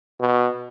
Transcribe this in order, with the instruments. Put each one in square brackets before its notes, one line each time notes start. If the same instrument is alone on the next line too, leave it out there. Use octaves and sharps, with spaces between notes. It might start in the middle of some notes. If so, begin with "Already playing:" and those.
[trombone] B2